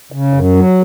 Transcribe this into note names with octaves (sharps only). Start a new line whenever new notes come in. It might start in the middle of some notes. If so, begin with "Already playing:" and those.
C#3
F#2
F#3